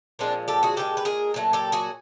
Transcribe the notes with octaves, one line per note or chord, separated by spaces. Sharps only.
A#2 F3 G#3 C4 D4
G4 A4
F#4 G#4
A#2 F3 G#3 G4 A4
B4
G#4 A#4
A#2 F#3 A3
G4 A4
F#4 G#4